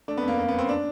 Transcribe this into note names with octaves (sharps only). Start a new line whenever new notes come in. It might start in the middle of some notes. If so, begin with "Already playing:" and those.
A3 D4
B3
F2
A#3
F#2 A#3
B3
F#2 C4
D4